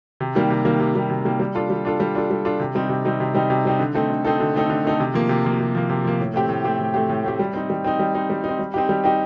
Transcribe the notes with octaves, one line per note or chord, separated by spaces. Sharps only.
C3
D#3 G3 A#3
C3
D#3 G3 A#3
C3
D#3 G3 A#3
C3
D#3 G3 A#3
G3
D4 F4 A4
G3
D4 F4 A4
G3
D4 F4 A4
G3
D4 F4 A4
C3
G3 C4 D#4
C3
G3 C4 D#4
C3
G3 C4 D#4
C3
G3 C4 D#4
D3
A3 C4 D#4 A4
D3
A3 C4 D#4 A4
D3
A3 C4 D#4 A4
D3
A3 C4 D#4 A4
C3
F3 A#3
C3
F3 A#3
C3
F3 A#3
C3
F3 A#3
A2
A3 C4 G4
A2
A3 C4 G4
A2
A3 C4 G4
A2
A3 C4 G4
G3
C4 D#4
G3
C4 D#4
G3
C4 D#4
G3
C4 D#4
G3
C4 D#4 G4
G3
C4 D#4 G4